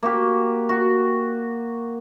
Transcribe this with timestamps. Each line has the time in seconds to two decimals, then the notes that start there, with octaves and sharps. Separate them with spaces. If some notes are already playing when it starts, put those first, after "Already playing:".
0.03 A#3 F#4 G4
0.69 F#4